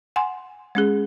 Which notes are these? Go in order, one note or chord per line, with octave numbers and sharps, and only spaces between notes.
F#5 G#5 C6
G#3 C#4 G#4